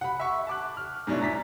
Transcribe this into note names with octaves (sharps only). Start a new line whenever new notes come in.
F#5 B5
E5 C#6
A5 D6 F#6
F6
G#2 B2 F#3 D4 E4
A#5 A6 B6